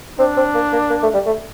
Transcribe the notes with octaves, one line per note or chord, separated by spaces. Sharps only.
C4 D4
C4
A#3
A#3
A#3
A3
G3
A3